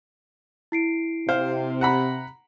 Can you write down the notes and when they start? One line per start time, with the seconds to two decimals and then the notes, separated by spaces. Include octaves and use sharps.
0.72 E4 C7 D7
1.29 C3 C5 F5
1.81 F#5 A#5 B5